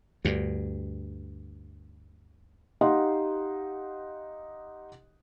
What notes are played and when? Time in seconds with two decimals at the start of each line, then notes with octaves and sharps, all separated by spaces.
0.25 D2 G2
2.81 D#4 G4 D#5 F5 F#5 C6